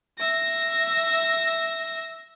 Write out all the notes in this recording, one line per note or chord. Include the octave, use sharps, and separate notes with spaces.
E5 A#6